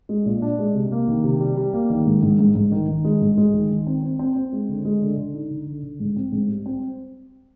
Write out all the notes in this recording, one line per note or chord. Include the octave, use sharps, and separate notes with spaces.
G#3
A#2
D4
G#3
C3
A#3
D#3
C3
G3
G3
A#3
D#3
G#2
G#2
G#2
G#2
D#3
D#3
G#3
G#2
G#3
D#3
D#3
C4
C4
C4
C4
G#3
D3
G#3
D3
D3
D#4
D3
D3
D3
G#2
C4
G#2
G3
C4